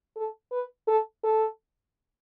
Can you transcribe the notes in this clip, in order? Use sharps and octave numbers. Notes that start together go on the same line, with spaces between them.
A4
B4
A4
A4